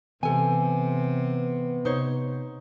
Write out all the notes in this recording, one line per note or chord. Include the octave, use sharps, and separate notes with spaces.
C3 E3 B3 A4 G#5
C3 D#4 C5 C#5